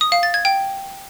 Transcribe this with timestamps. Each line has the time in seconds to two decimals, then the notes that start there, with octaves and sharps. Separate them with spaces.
0.01 D#6
0.12 F5
0.23 A6
0.34 G#6
0.45 G5